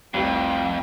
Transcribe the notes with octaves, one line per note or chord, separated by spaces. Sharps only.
F1 C2 F2 G5